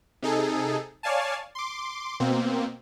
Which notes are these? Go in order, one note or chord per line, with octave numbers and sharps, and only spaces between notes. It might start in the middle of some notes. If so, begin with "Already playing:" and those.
C3 D#4 G#4 A4
C#5 D5 F5 G#5 A5
C6 D6
B2 A#3 C4